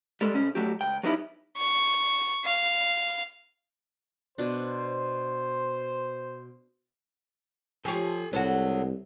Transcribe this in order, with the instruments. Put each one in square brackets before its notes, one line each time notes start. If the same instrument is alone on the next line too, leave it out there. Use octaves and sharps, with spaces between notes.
[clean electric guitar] G3 G#3 A4
B2 C#4
F#3 A3 F#4 G4
C#2 G5
F#3 G3 B3 D#4 E4 G4
[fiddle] C#6
F5
[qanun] B2 D4 [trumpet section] C5
[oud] F3 G4 C#5 [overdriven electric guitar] A4 G#5
[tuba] C2 [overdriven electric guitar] G#3 C#5 [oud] F#4 A4 B4